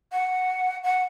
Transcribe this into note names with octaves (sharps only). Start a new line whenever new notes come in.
F#5
F#5